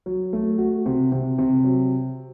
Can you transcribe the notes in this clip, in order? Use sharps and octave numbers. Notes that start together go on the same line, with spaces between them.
F#3
A3
F#4
C3
C3
C3
F#3